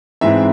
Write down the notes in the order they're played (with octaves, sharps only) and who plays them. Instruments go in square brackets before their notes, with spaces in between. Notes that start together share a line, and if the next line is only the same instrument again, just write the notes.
[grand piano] G#2 E3 G#3 C4 E4 E5